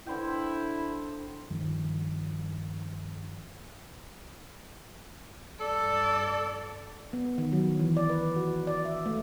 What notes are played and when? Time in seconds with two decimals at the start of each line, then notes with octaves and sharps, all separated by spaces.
0.07 D3 E4 C5 G5
1.50 G2 D#3 F3
5.60 G2 A4 D5
7.13 B3
7.38 D#3
7.53 F#3
7.79 E3
7.97 D5
8.10 B4
8.36 F#4
8.67 D5
8.85 E5
9.06 A3